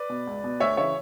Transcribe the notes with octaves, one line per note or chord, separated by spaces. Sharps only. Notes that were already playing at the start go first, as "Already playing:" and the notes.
Already playing: B4 D5
B2
C#2
B2
D2 C#5 E5
C#3 E3 C#5 E5